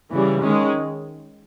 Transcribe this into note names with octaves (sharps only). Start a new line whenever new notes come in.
C#3 E3 G3
D#3 G#3 C#4